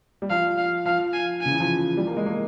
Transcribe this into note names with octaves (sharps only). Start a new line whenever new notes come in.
G3
F3 F5
F5
F3 F5
G#5
C#3 G#5
E3
F3
G3
A#3
G#3
A#3